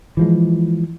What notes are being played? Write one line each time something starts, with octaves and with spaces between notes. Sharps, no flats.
E3 F3 G#3